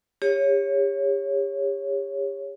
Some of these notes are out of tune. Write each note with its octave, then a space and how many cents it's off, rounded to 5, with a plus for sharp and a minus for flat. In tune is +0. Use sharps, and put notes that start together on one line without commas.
G4 +40 C#5 +0